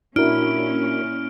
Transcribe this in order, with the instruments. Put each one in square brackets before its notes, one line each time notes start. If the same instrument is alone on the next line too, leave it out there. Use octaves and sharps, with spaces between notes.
[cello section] A#2 C#4 [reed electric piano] D4 F#4 A#4 [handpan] E4 [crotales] F6 D7